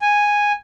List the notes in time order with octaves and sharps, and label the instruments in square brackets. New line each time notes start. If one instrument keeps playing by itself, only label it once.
[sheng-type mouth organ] G#5